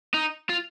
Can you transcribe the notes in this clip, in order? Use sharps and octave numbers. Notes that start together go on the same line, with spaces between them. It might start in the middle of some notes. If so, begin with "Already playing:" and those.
D#4
F4